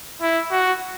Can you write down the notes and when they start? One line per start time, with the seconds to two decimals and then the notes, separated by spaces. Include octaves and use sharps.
0.21 E4
0.52 F#4